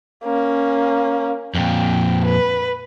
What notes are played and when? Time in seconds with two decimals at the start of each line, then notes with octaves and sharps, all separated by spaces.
0.24 A#3 C#4
1.55 F2 A#2 G5
2.25 B4